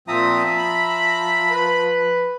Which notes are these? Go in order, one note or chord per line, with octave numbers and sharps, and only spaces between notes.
A#2 F3 C4 E5 A#5 D#6
B5
B4